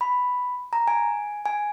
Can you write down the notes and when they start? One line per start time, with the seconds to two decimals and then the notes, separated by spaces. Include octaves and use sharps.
0.01 B5
0.73 A#5
0.88 G#5
1.46 G#5